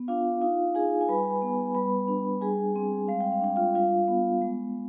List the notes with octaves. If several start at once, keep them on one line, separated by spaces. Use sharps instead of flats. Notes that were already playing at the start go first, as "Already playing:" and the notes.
Already playing: B3
D4 F4 F5
D#4 F4 F5
D#4 G#4 G#5
G#5
G3 B4 B5
B3
G3 B4 B5
D4
G3 G#4 G#5
C4
G#3 F5
G5
F5
D4 G5
F4 F5
G3 F4 F5
B3
G#3